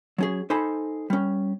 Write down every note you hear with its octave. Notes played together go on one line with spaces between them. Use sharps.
F#3 C#4 G#4
D#4 A4 C5 G#5 A5 B5
G3 C#4